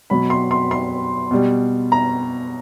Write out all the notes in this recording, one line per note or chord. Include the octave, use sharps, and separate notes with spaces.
B2 F#3 B5
C6
C6
C6
B2 G3
A#5